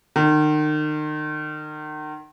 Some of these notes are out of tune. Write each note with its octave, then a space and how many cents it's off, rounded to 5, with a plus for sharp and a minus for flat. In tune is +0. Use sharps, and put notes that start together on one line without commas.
D#3 -35